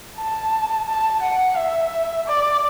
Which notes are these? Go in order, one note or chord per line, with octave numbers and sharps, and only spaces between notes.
A5
A5
F#5
E5
D5